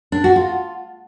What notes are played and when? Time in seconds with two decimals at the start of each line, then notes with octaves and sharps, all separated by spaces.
0.12 D4
0.24 F#4
0.36 F4